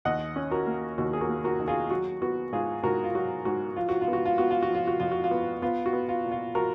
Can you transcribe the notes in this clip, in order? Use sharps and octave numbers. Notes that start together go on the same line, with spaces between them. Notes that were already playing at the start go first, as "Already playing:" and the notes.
D#2 D#5 F#5
C#4
F#4 A#4
A#3
D#2 F#4
G#4
F#4 A#4
A#3
F#4 A#4
D#3
F4 G#4
F#3 F#4
B3 F#4
G#2 F4 G#4
G#2 F#4 A#4
F4
F#3 F#4
G#2 F#4
F3 F4
F#4
F4
B3
F#4
F4
B3 F#4
F4
F#4
F3 F4
F#4
F2 F4
F#4
F4
B3
B3 F4
F#4
B3
F4
A#2
F4
F3 F#4 A#4